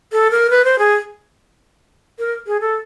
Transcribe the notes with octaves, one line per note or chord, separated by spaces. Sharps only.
A4
A#4
B4
C5
G#4
A#4
G#4
A4